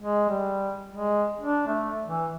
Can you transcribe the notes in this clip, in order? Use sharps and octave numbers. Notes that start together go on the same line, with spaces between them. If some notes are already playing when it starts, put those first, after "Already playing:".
G#3
G3
G#3
D4
A3
E3